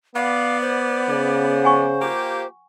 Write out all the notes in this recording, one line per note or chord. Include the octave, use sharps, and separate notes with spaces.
B3 D5 F5
C5
C#3
F#5 G#5 C#6
A#3 F4 G4